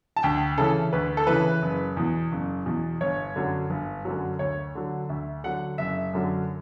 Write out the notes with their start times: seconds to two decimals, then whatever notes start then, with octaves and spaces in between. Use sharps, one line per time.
0.16 A5
0.23 D2 G5
0.57 C#3 E3 A4
0.93 D2 B4
1.17 A4
1.27 C#3 E3 B4
1.62 F#1
1.97 E2 B2
2.32 F#1
2.66 E2 B2
3.01 G1 C#5
3.36 F#2 D3 F#3
3.70 G1
4.05 F#2 D3 F#3
4.39 D2 C#5
4.75 D3 F#3
5.09 D2 E5
5.44 D3 F#3 F#5
5.78 F#1 E5
6.14 F#2 D3 F#3